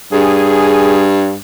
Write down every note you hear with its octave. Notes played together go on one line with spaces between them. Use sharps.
G2 G#4